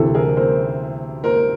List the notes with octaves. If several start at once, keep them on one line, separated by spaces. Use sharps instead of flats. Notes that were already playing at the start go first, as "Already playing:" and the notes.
Already playing: D2 C3 E3 A4
G#4 A#4
A#4 C5
A#4 C5